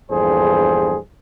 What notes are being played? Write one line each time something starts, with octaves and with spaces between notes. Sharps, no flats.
A#1 E2 G2 G#4 A4 C5